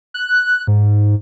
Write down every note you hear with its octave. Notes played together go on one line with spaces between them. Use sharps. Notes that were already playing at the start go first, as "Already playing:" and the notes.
F#6
G#2